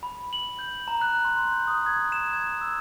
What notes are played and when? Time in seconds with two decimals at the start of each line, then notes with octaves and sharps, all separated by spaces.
0.03 B5
0.33 F#7
0.59 G6
0.88 A#5
1.01 F#6
1.25 C6
1.52 G6
1.68 D#6
1.86 G#6
2.12 E7
2.33 G#6
2.61 E6